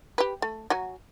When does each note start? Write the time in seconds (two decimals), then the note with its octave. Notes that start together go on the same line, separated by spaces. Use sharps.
0.18 G4 B4
0.42 A3
0.70 F#3 F#4 G#5